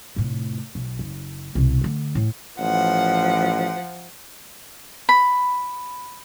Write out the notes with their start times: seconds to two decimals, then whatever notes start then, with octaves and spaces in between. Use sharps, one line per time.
0.16 F1 A2
0.75 B1
0.99 F#1
1.55 C2 B2
1.81 D3 A3
2.15 A2
2.59 A1 F3 F#5
5.09 B5